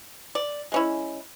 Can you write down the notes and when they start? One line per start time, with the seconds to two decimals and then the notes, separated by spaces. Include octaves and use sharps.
0.35 D5
0.72 G#3 C#4 E4